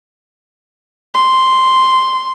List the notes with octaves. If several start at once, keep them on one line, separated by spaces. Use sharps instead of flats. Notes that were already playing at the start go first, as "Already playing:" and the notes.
C6